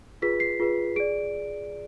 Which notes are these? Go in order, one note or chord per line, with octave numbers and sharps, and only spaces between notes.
F4 G#4 B4 B6
C7
F4 G#4 B4
G#4 D5 D7